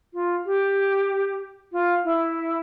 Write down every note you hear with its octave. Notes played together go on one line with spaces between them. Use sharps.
F4
G4
F4
E4